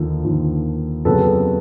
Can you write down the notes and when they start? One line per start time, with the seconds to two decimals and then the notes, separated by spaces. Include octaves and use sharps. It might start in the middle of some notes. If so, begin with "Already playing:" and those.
Already playing: D#2 D3 F3
0.25 D#2 D3 F3
1.05 F2 C#3 F#3 B3 A4 B4